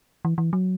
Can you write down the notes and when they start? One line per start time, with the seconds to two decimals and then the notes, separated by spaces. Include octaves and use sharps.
0.25 E3
0.38 E3
0.53 F#3